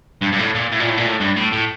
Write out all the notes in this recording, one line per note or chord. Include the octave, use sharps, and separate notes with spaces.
G2
G2
A2
A#2
A2
A#2
A2
A#2
A2
G2
A2
A2